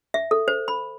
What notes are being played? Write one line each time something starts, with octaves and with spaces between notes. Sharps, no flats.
E5
A4
C5
B5